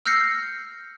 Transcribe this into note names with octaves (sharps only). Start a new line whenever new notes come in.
E6 F6 G6 A#6 C7 C#7